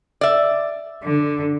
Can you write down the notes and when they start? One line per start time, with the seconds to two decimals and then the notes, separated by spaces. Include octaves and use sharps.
0.21 D5 E5
1.04 D3